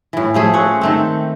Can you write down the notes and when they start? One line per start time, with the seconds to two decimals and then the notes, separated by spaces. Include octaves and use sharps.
0.13 A2 E3
0.34 F3 A3 G#4
0.53 C4 C#4 C#5 F#5
0.81 D#3 A3 C4